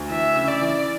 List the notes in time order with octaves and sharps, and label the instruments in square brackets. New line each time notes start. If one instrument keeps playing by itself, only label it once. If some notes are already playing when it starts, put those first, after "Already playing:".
Already playing: [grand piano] D2
[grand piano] E3 [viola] E5
[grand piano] C#3
[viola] D5
[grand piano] E3